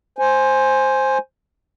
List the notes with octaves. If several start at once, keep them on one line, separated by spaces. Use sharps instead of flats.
C5 G#5